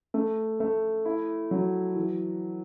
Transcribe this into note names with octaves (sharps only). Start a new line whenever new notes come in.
A3
A3
E4
F#3
E3